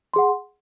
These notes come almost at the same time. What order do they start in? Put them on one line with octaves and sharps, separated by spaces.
C6 G#4 F#5